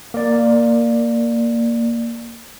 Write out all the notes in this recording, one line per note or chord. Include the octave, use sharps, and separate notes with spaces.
A#3 D5